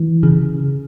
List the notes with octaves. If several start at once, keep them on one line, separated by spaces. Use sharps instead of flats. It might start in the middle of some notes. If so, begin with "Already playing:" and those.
Already playing: E3
C#3